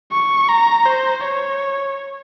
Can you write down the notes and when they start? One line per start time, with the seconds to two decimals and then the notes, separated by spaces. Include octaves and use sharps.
0.12 C#6
0.49 A#5
0.86 C5
1.24 C#5